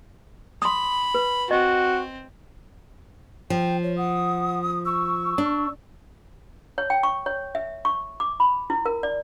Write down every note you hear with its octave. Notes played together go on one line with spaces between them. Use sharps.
B5 C6 D#6
B4
C4 F#4 D#5
F3 G5
C#5
F#5 D#6
C#6 E6
D4
C#5
G5
C#6
C#5
E5
C#6
D6
B5
E4
A#4
D5